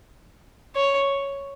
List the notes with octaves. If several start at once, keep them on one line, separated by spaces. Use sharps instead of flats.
C#5